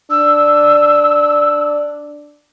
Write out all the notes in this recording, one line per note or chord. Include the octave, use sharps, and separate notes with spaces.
D4 E6